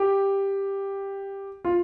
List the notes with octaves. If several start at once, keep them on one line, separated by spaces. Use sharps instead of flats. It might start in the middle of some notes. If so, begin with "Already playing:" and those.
Already playing: G4
F4